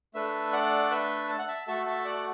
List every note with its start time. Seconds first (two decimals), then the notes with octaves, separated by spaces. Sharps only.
0.14 A3 D4 A4 B4 E5
0.52 D5 F#5
0.91 B4 E5
1.29 A5
1.39 F#5
1.48 E5 A5
1.67 A3 F#4 A4 E5 A5
1.86 E5 A5
2.05 D5 F#5